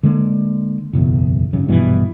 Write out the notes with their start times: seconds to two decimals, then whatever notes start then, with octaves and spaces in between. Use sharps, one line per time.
0.03 D3 G#3 A#3
0.93 F#1 B1 E2
1.53 G#1 F#2 C#3
1.68 A#1 G2 B2 E3